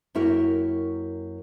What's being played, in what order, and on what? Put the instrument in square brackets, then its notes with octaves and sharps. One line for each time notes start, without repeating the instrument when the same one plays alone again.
[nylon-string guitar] F#2 A#3 E4 F#4 A#4 G5